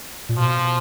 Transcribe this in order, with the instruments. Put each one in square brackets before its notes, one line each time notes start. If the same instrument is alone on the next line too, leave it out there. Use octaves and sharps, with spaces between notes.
[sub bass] A#2
[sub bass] B2 [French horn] F3